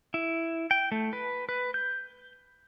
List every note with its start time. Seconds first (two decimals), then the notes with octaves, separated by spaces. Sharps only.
0.14 E4
0.71 G5
0.92 A3
1.13 B4
1.49 B4
1.74 G6